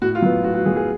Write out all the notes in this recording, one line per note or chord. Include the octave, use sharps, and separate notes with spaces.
A2 F#4
F4
F#3 B3
A2 F#4
F#4
F#3 B3 G#4
G#4